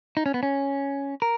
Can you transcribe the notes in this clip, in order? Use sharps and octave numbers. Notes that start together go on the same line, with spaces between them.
D#4
C#4
B3
C#4
A#4